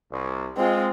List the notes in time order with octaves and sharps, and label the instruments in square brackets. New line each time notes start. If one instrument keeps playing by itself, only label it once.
[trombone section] C2
[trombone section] G#3 [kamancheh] C4 F4